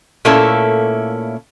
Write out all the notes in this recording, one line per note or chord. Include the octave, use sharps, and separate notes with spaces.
A#2 A3 A#3 C#4 E4 A4